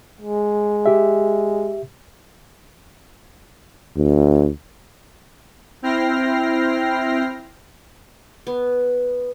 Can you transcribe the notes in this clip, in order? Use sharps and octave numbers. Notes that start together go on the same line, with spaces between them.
G#3
G4 E5
D2
C4 E4 G5 F6 A#6 C7
B3